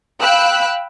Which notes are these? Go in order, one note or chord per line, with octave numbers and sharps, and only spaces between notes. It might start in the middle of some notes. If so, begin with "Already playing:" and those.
F5 G5 B5 E6 F#6